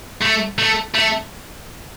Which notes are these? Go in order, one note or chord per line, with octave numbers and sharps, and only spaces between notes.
A3
A3
A3